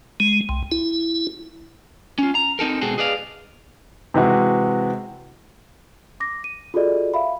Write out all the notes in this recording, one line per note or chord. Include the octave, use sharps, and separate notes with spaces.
G#3
C2
E4
C#4 F4
A#5
C4 D#4 A4 A#4
B2 G#3 C4 F#4 G#4 A4
G#4 B4 D5 D#5 F5
C3 E3 G#3 F#4
D6 A#6
D#7
F4 F#4 G#4 A4 D5 D#5
E5 F5 B5